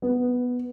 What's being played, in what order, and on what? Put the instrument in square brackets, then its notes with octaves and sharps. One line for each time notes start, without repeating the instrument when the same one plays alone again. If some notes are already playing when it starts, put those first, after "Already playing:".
[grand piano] B3